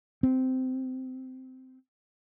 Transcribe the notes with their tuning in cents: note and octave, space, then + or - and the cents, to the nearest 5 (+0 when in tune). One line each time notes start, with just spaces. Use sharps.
C4 -15